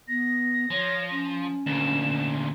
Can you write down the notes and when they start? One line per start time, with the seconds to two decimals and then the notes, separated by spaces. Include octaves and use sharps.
0.08 B3 A#6
0.71 F3 C#5
1.11 C#4
1.66 D2 A#2 E7